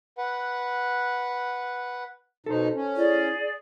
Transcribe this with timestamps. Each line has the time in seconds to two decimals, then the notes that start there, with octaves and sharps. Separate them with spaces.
0.18 B4 F#5
2.46 B2 D#4 A4 C5
2.74 C#4
2.96 E4 G#4 D5